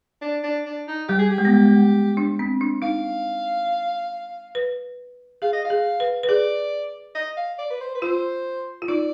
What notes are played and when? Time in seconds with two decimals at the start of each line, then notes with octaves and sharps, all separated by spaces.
0.22 D4
0.43 D4
0.66 D4
0.88 D#4
1.08 G3 G4
1.19 G#4
1.30 G4
1.38 G#3
1.45 B3
1.54 G#3
1.66 G#3
2.17 D4
2.39 C4
2.61 D4
2.82 D#4 F5
4.55 B4
5.42 G#4 F5
5.53 D#5
5.65 F5
5.70 G#4
6.00 B4
6.23 B4
6.29 G#4 D5
7.15 D#5
7.37 F5
7.59 D5
7.70 B4
7.81 C5
7.95 B4
8.02 F4 C5
8.82 F4
8.88 D#4 D5